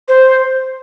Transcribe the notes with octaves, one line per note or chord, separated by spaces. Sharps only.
C5